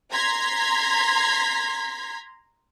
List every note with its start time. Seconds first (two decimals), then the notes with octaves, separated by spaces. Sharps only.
0.12 A#5 C6 G#6 B6